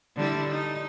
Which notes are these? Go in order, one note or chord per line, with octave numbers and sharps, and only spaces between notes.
D3 G3 E4
D#4